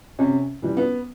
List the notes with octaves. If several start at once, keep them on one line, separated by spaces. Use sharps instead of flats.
C3 C#4
E3 G3
B3